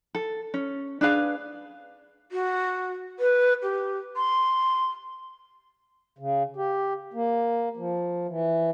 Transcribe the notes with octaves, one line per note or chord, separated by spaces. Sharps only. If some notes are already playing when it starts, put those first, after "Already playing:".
A4
C#4
D4 G#4 B4 F5
F#4
B4
G4
C6
C#3
G4
A#3
F3
E3